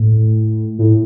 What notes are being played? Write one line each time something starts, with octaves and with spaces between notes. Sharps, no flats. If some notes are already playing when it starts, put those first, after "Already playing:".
Already playing: A2
A2